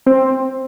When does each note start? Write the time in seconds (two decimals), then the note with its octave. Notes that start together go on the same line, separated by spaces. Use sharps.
0.06 C4